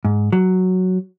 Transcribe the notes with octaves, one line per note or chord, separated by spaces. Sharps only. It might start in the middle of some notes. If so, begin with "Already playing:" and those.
G#2
F#3